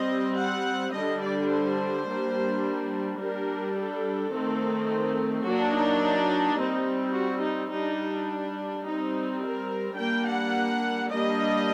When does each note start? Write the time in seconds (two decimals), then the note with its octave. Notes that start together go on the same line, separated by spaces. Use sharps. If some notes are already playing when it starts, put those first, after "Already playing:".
Already playing: G3 C4 D#5
0.38 F#5
0.94 D3 G3 D4 D#5
1.23 D5
1.50 C5
2.07 G3 A#3 D4
3.20 G3 D4 A#4
3.76 A4
4.32 D#3 A3 C4
5.45 F#3 A#3 D4 F#4
5.74 D#4
6.02 D#4
6.58 G3 C4
7.15 F#4
7.43 D#4
7.71 G3 D4 D#4
8.84 G3 C4 D#4
9.42 A#4
9.97 G3 A#3 D4 G5
10.26 F#5
11.10 G3 A#3 D4 D#5